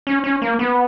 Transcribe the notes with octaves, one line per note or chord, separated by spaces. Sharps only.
C#4
C#4
A#3
B3